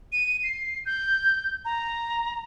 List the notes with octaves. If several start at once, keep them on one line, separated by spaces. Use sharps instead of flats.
D#7
C7
G6
A#5